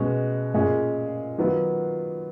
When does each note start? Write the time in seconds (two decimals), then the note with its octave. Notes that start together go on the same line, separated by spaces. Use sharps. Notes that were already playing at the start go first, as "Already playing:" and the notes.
Already playing: B2 G#3 C#4 F#4
0.54 A#2 G#3 C#4 G#4
1.38 D#3 F#3 B3 F4